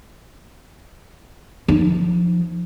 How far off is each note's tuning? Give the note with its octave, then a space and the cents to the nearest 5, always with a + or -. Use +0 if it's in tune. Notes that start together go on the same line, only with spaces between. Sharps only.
F3 +0 D#4 +0